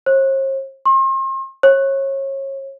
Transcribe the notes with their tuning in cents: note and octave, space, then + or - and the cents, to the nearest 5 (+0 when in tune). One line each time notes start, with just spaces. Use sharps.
C5 +45
C6 +40
C#5 -30